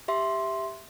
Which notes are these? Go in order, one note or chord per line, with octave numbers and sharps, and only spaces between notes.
G4 E5 C6